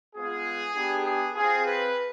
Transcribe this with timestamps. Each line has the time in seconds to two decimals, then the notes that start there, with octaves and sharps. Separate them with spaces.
0.16 G#3 B3 F4 G#4
0.75 B3 D4 G4
1.05 G#4
1.34 C4 F4 G#4
1.65 B4